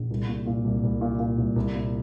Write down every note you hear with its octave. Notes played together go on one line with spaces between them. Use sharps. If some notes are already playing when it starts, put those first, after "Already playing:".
Already playing: A#1
C2
A#2
A#2
C2
C2
A#2
A#2
C2
C2
A#2